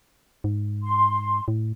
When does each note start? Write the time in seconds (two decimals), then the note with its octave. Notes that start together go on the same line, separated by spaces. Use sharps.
0.44 G#2
0.83 C6
1.48 A2